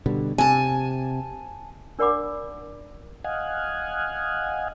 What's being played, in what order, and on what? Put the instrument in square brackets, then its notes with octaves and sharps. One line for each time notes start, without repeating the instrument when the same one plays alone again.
[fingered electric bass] B2 D3 G3
[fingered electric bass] C3 [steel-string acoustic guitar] G#5 A5
[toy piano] D4 A#4 D5 F#5 B5 D6
[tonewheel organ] D#5 F5 F#5 G#5